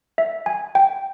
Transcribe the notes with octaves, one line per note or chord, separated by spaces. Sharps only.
E5
G#5
G5